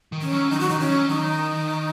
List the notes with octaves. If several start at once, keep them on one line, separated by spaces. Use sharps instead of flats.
D#3
C#4
F#3
D#3 D#4
F#4
D#3 D#4
C#4
F#3
D#3 D#4